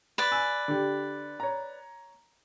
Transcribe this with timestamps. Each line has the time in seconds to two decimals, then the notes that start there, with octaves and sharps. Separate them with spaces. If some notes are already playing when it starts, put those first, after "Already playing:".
0.18 B4 D5
0.32 G#5 E6
0.68 D3 G4
1.40 C#5 A#5